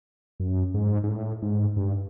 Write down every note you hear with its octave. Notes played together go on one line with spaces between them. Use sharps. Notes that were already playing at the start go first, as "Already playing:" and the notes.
F#2
G#2
G#2
A2
G#2
G2